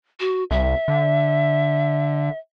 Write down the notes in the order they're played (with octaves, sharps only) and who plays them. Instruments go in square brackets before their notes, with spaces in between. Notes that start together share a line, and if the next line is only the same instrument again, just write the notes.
[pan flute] F#4
[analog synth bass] C2 [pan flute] E5
[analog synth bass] D3